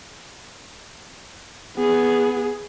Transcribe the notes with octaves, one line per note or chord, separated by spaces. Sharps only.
B3 G#4